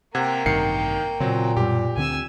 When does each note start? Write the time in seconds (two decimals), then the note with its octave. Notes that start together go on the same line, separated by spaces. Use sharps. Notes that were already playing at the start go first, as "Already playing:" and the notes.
0.15 C3 A#3 F#5 G5 G#6
0.46 A1 G2 C3 D#3 C7 C#7
1.20 A#2 C#3 F#3 C4
1.57 F#2 B2 G3 G4
1.97 D2 D3 C4 G#5 E6